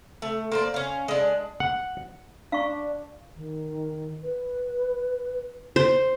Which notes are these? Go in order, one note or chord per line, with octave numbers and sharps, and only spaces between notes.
A3
A#3 C5 D5
C#4 F5
G#3 D4
F#5
D4 F5 C#6
D#3
B4
C5